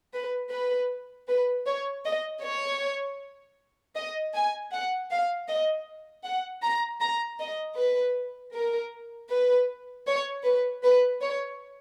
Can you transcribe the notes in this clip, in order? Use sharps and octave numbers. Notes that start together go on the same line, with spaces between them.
B4
B4
B4
C#5
D#5
C#5
D#5
G#5
F#5
F5
D#5
F#5
A#5
A#5
D#5
B4
A#4
B4
C#5
B4
B4
C#5